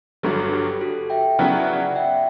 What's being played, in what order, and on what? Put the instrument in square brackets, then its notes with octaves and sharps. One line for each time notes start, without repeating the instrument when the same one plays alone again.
[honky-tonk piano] G1 G2 F#3 [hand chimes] F#4 A4
[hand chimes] G4
F#4 A4
E5 G5
[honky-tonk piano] C#3 F#3 B3 E4 [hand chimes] D5 F#5
[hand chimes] D5 F#5
E5 G5